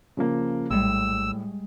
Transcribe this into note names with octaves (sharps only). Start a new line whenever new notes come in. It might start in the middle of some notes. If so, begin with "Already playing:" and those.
C#3 F3 A#3
A#1 A2 G3 G#3 E6